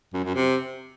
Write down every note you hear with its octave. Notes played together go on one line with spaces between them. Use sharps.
F#2
F#2
C3